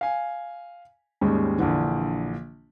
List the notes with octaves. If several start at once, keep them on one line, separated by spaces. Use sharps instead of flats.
F5 G#5
D#2 G#2 G3 G#3 C#4
A#1 D3 E3